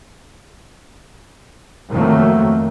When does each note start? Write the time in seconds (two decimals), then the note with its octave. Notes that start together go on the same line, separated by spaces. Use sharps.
1.90 F2 D#3 F#3 A3 A#3